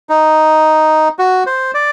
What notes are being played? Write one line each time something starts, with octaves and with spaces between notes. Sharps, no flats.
D#4
F#4
C5
D5